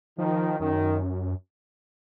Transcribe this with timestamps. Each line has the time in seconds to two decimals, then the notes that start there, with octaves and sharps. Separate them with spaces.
0.18 D#3 F3
0.59 F#2 D#3